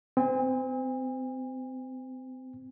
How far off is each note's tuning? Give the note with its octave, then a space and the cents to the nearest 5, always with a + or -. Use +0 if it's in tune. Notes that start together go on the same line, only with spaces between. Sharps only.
C4 -30 G#5 -45